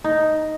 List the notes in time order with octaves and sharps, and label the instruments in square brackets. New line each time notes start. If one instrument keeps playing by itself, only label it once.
[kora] D#4